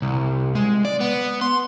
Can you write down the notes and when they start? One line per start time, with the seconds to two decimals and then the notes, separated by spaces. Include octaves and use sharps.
0.02 C2
0.55 G#3
0.85 D5
1.00 B3
1.41 C6